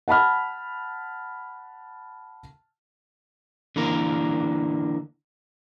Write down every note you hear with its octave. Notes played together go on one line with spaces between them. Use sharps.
F#5 A5 B5 F6
D3 E3 A#3 A#4